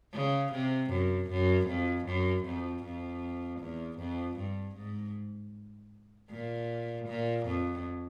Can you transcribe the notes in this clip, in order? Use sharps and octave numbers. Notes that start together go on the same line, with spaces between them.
C#3
C3
F#2
F#2
F2
F#2
F2
F2
E2
F2
G2
G#2
A#2
A#2
F2